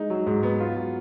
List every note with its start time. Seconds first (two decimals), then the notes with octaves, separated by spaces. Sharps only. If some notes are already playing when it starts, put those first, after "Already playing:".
Already playing: G#3 D#4
0.10 F#3
0.26 G#2
0.43 B3
0.60 F4
0.76 F#3